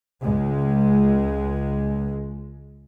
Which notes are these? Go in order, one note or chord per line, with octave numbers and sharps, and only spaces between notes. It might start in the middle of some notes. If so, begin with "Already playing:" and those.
C#2 G#3